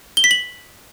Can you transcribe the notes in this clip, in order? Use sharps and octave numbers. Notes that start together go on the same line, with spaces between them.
G7
B6
F#7